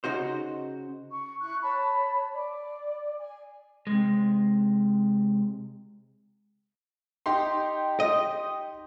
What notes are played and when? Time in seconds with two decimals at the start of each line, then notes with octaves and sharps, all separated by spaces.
0.04 C#3 D#4 F#4 C5
1.09 C#6
1.41 E4 C#6 F#6
1.63 C#5 A5 B5
2.33 D5
3.19 G#5
3.87 C3 G#3
7.26 D#4 G4 C6
8.00 D#5